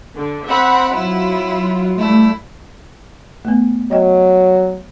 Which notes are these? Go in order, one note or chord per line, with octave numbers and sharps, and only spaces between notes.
D3
C4 E5 F#5 B5
F#3 E4 F4
G3 A3 E4
A3 B3
F#3 D#5 G5